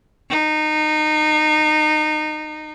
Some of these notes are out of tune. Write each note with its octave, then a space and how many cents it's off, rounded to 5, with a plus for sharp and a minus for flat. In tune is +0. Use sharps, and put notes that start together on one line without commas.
D#4 -25